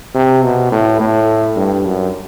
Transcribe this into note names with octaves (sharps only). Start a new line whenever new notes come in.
C3
B2
A2
A2
G2
F#2